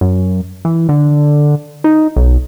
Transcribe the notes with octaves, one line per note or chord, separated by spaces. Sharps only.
F#2
E3
D3
D#4
B1